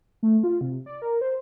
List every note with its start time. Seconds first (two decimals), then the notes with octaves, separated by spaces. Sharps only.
0.23 A3
0.43 F4
0.61 C3
0.86 D5
1.02 A#4
1.21 C5